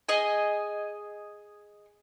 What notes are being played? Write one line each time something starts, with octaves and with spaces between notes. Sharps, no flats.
G#4 D#5 G#5